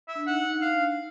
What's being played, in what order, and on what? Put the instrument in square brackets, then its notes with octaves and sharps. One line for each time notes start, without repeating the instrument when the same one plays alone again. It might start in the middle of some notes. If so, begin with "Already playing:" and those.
[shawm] E5
[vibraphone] D4
[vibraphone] D#4 [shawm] F#5
[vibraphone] D#4
[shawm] F5
[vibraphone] D4